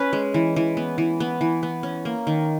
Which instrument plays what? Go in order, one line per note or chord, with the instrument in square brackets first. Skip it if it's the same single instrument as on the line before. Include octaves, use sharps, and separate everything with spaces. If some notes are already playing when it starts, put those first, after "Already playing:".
Already playing: [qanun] C#4 B4
G#3
E3
E3
B3
E3
B3
E3
B3
C#4
A#3
D#3